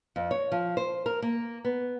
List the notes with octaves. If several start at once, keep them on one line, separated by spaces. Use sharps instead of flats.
F2
C#5
F3
C5
A#4
A#3
B3